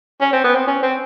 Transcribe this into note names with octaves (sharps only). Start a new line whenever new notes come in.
C#4
C4
B3
C4
C#4
C4